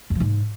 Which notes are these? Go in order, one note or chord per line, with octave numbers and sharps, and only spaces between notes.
F2
F3
G#2